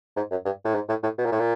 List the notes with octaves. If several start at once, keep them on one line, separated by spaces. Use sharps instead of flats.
G#2
F#2
G2
A2
G#2
A2
A2
B2
A#2
A2
A#2